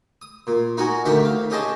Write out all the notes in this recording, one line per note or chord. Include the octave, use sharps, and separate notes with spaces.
D#6
A#2
D#4 F#4 A#4 F#5 G#5
D2 D#3 G4 E5 F#5 G5
F5
C#4 G4 G#4 D#5 A5 C6